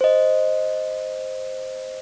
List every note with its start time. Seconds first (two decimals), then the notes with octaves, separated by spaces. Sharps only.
0.01 C5 D#5